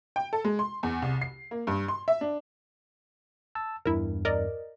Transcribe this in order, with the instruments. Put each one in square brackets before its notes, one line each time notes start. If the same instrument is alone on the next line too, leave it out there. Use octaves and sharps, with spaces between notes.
[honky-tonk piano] G5
A4
G#3
C6
E2
C2
C7
A#3
G2
C6
E5
D4
[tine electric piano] A5 E6
[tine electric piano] E2 G2 [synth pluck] E4 A#4
[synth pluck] A#4 D5 D#5